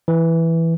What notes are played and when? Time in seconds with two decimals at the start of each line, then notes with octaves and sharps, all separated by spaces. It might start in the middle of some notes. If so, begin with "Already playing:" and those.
0.08 E3